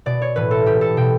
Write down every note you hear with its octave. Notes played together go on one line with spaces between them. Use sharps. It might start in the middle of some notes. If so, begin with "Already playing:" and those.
B2 D5
C#5
A2 E3 B4
A4
B2 G4
A4
B2 G5